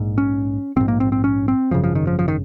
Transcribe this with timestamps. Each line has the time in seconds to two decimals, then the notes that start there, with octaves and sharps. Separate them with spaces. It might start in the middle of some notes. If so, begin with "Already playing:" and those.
Already playing: A#1 G#2
0.18 C#4
0.76 A#1 G#2 C4
0.88 A#3
1.00 C4
1.12 C4
1.24 C#4
1.48 C4
1.71 G#1 F#2 C#3 F3
1.84 F3
1.95 D#3
2.07 F3
2.19 F3
2.28 D#3